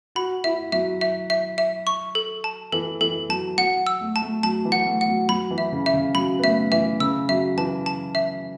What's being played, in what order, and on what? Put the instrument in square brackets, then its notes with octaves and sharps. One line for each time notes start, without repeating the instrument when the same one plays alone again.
[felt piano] F#4 [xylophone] B5
[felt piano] E4 [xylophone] E5
[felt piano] F#3 [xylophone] E5
[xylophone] E5
E5
E5
C#6
A4
A5
[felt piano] E3 [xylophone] A4
[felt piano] E3 [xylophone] A4
[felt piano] F#3 [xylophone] A5
[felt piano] F#3 [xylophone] F#5
[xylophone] E6
[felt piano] A3
[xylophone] A5
[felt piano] A3
[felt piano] F#3 [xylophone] A5
[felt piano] E3
[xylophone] F#5
[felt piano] A3
[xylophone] F#5
[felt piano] F#3
[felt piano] F#3 [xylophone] B5
[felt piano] E3
[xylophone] E5
[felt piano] C#3
[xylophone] E5
[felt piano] C#3
[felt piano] F#3 [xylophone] B5
[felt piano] B3
[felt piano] A3 [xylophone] E5
[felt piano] E3 [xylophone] E5
[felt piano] C#3 [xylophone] E6
[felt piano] F#3 [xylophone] E5
[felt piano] E3 [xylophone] A5
[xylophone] A5
E5